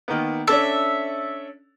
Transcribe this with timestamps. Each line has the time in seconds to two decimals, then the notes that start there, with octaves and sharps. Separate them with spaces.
0.08 D#3 A#3 B3
0.48 C#4 D4 A4 E5